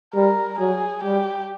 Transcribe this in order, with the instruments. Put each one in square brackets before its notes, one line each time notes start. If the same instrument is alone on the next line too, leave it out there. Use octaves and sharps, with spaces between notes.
[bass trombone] G3 [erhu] A#4
[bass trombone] F#3 [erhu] G#4
[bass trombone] G3 [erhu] G4